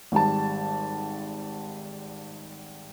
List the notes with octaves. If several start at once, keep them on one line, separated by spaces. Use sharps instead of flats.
G#1 G3 A5